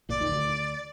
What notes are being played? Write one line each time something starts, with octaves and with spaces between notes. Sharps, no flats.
A#1 A#2 D5
D#2 D#3
D2 D3